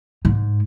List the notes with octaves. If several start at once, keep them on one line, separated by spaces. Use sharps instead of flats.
G#2